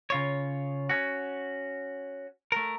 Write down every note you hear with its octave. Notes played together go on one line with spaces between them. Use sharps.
C#3 F4 C#5
C#4 F#4
A3 A#4